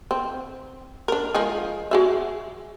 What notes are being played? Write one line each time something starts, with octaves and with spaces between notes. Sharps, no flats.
C4
D4 A#4
F3 G#3 G#4
F#4 G#4 E5